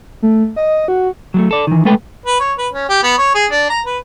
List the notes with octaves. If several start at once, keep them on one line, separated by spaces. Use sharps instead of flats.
A3
D#5
F#4
F#3 G#3 A3
A4 D5
D#3 E3
G#3 A3 A4 B4 G5
B4
C#5
B4
C#4
G4
B3
C#5
G#4
D4
A#5
B4